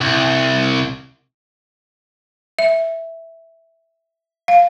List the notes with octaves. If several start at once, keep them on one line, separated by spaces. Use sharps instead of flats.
C2
E5
F5